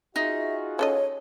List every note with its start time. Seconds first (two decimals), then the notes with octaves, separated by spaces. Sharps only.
0.16 D#4 F4 F#4 G#4 E5
0.79 C#4 A4 C#5 D#5